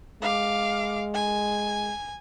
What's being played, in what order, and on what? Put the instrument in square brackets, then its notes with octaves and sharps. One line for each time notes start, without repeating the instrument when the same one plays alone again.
[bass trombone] G#3 [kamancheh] F5 D6
[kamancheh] G#5